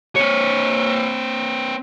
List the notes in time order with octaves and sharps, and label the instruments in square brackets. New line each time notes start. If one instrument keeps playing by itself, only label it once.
[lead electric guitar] C4 C#5